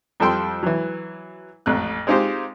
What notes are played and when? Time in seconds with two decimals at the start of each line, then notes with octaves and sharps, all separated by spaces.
0.20 F2 F3 G3 A4 G5 C6
0.63 E3 F#3
1.66 A1 F2 F#6
2.07 G#3 C4 D#4 F4 G4 C5